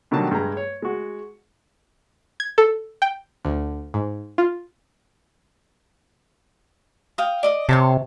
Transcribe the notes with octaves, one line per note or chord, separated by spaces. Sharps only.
B2 D3 D#3 F#3 G3 A5
G2 G#3 A#5
C#5
G#3 F#4
G#6
A4
G5
D2
G#2
F4
F5 G5 D#6
D5 D#5 D#6
C3 A4 C#5 C6